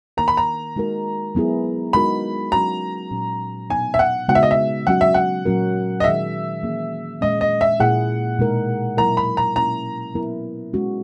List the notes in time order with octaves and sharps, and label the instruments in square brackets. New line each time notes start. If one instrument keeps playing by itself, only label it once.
[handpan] D#3 A#3 D#4 A#4 [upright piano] A#5
[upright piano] B5
A#5
[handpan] G#3 D#4 F#4 A#4
F#3 B3 E4 G#4
[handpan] G#3 D#4 F#4 A#4 [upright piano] B5
[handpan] F#3 C#4 F#4 [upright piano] A#5
[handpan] A#2 F#3 C#4
[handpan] B2 F#3 B3 D#4 [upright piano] G#5
[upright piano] E5
F#5
[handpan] C#3 G#3 B3 D#4 F#4 [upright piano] F#5
[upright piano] E5
D#5
E5
[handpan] F#3 C#4 F#4 [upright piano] F#5
[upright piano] E5
F#5
[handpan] A#2 F#3 C#4 F#4 A#4
[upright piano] D#5
[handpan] D#3 G#3 D#4 G#4 [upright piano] E5
[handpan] E3 A#3 C#4 G#4
[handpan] A#2 G#3 C#4 [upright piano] D#5
[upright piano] D#5
E5
[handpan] A#2 A#3 E4 G#4 [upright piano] F#5
[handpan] B2 G#3 D#4 A#4
[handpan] F#3 A#3 E4 A#4 [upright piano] A#5
[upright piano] B5
A#5
[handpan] B2 A#3 C#4 E4 [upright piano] A#5
[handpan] F#3 B3 E4 A#4
G#3 C#4 F#4